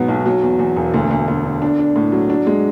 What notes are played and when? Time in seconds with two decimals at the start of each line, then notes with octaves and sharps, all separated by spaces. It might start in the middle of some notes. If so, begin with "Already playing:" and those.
Already playing: G#2 B2 F#3 B3
0.08 B1
0.26 F#3
0.43 E2
0.59 E2
0.77 E1
0.94 D2
1.11 D2
1.28 D2
1.44 D3
1.62 D4
1.79 D4
1.96 A2
2.12 F#3
2.30 D4
2.47 G#3